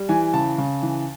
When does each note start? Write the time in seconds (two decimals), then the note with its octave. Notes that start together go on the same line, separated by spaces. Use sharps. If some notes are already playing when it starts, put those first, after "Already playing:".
Already playing: G3
0.09 E3 G#5
0.33 C#3 A5
0.58 C#3
0.82 E3